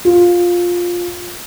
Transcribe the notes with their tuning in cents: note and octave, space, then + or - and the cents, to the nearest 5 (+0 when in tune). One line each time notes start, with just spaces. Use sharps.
F4 +10